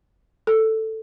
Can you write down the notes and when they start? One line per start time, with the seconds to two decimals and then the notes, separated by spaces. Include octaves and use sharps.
0.47 A4